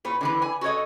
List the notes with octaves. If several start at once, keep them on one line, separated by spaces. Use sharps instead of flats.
A#2 B4 C#5
D3 E3 B4
G#5
F#4 A4 C#5 D#5